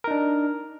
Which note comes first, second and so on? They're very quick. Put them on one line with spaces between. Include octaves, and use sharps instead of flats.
A#4 D#4 D4